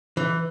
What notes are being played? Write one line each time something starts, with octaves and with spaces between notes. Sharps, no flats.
E3